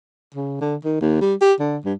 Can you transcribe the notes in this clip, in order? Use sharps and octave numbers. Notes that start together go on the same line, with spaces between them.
C#3
D3
D#3
D#2
G3
G4
D3
G2